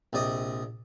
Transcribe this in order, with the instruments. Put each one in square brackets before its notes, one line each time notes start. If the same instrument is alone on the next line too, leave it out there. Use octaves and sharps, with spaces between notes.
[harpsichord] A#1 C3 D5 D#5